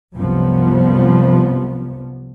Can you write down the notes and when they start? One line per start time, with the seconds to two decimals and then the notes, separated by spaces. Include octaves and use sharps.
0.15 C2 F#2 C3 F3 G3 B3